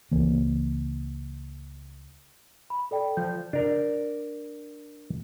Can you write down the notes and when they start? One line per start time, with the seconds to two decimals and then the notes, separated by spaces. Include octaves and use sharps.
0.11 C#2 E3 A#3
2.70 B5
2.91 A4 D5 G5
3.17 F3 G6
3.53 D4 A#4